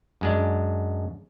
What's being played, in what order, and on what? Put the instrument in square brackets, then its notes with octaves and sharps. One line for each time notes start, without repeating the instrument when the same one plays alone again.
[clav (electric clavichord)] F#2 G#3 D4